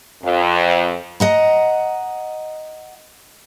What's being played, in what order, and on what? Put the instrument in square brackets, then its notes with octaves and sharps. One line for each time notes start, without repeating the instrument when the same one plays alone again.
[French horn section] F2
[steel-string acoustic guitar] D#5 F#5 A#5